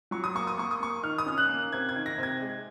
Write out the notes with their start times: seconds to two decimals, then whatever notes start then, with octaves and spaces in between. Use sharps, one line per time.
0.11 F#3 C#6
0.24 D#6
0.35 A#3 C#6
0.47 D#6
0.58 A#3 C#6
0.71 D#6
0.80 A#3 C#6
1.03 D#3 F6
1.18 D#6
1.26 C#4 F6
1.38 F#6
1.49 A#3
1.73 C3 G#6
1.89 G#6
1.96 D#3
2.06 A#6
2.18 C3
2.23 G#6
2.41 G#3